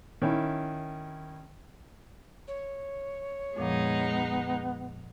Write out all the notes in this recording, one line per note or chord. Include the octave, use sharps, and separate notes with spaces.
D#3 C#4 E4
C#5
F2 A#2 F3 G#3 B3 D#4